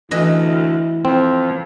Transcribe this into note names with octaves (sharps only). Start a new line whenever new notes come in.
D2 E3 E4 D#5
F2 C4